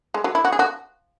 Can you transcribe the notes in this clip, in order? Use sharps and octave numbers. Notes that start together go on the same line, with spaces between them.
G#3
F#3
E4
F#4
G#4
F#4